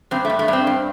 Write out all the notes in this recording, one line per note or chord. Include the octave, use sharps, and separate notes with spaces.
G2 C4
A3
G2
A3
G2 C4
G2